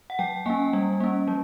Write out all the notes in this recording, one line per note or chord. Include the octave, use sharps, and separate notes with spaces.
F#5
F#3 G5
A#3 C#4 G#5
G3
A#3 C#4
F#3